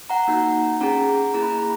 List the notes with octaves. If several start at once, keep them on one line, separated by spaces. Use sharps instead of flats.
F#5 A#5
A#3 D#4 F#4
C#4 G#4 F#5 A#5
A#3 E4 G#4 A#5
B5
A#5
B5